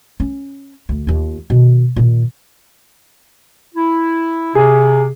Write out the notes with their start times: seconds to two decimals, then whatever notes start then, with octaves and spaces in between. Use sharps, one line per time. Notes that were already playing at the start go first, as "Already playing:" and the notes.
0.20 C#4
0.89 D2
1.07 D#2 F4
1.50 B2 D#3
1.96 A#2 D#3
3.74 E4
4.55 C3 G#4